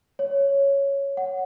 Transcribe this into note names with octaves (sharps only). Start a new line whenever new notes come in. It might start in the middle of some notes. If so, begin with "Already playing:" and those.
C#5
F#5